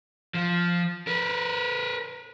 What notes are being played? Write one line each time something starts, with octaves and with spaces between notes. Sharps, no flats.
F3
A#4 B4